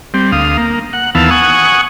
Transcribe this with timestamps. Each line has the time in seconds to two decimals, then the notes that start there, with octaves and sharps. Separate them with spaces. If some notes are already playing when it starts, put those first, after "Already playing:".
0.14 G3 C4
0.32 D2 F5 D#6
0.57 A#3
0.93 F#5
1.15 D#2 E3 B3 F5 A5 E6
1.30 F#5 G#5 C#6 D#6